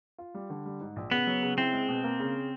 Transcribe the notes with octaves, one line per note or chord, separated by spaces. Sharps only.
F4
G3
D3
G3
G#2
A#1
C#3 B3
F#3
C#3
C4 E4
G#3
B2
A#3
C#3